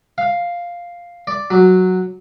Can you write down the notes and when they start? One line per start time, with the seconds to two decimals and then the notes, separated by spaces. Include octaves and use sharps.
0.18 F5
1.27 D5
1.51 F#3